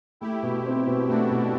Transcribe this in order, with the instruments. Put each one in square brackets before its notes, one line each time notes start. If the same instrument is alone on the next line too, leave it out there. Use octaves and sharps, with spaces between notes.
[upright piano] A3 [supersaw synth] E4 G4
[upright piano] B2
C4
B2
[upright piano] A3 [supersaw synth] D4 F#4
[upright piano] B2